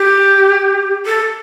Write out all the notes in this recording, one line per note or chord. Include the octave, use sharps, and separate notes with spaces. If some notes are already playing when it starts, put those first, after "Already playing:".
Already playing: G4
A4